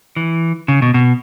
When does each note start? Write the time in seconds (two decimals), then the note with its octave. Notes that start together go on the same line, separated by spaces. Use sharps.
0.16 E3
0.68 C#3
0.82 B2
0.94 B2